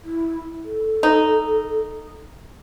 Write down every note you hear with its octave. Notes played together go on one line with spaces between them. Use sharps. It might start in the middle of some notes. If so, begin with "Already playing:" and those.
E4
A4
D#4